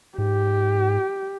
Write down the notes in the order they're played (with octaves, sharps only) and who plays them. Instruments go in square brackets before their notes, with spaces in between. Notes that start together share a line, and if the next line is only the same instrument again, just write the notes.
[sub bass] G#2 [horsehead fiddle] G4